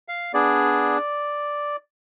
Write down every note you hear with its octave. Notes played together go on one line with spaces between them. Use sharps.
F5
B3 D4 G#4 D5